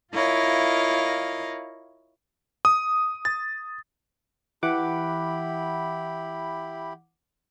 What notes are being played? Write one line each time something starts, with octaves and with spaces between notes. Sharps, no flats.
E4 F4 A#4 C#5 D#5 F5
D#6
A6
E3 E4 G4 F#5 B5 D6